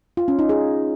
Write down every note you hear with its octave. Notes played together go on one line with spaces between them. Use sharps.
F4
C#4
D#4
G#4